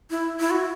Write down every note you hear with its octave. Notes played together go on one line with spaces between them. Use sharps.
E4
E4
F#4